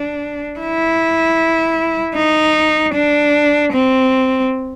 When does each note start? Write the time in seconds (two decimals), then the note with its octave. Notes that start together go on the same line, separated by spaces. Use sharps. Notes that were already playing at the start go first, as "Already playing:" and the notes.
Already playing: D4
0.60 E4
2.16 D#4
2.94 D4
3.73 C4